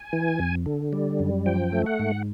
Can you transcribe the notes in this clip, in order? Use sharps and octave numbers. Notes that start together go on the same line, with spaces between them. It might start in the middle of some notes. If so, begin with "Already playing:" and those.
Already playing: G#5
E3
F2
D3
G3
F#2
F3 G5
A3
F#5
G#2